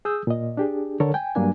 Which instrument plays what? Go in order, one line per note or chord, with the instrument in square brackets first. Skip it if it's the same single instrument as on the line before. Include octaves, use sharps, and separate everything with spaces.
[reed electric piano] G#4 D#6 E6 G6
A#2 D#5
D4 G4 G#4
D3 A4 A#4 C#5
G5 G#5
G2 F#3 A#3 D4 G#5